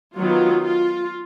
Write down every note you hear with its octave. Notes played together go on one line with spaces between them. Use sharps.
D#3 F#3 B3 F4
F4